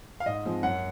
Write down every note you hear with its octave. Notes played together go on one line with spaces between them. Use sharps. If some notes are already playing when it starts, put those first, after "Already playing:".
F5
G#2 D#5
F3 G#3 C4
F#2 F#5